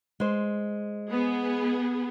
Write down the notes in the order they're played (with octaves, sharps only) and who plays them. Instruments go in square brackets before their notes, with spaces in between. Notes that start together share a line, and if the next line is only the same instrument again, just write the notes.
[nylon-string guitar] G#3 C5
[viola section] B3 G#4